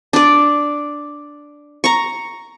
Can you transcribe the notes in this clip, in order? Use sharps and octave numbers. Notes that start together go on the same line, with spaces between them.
D4 D5
A#5 C#6